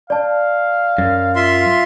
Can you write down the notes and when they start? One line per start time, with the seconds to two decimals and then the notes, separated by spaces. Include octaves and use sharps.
0.10 D5 F5 A5
0.98 F#2
1.36 F4 E5 C6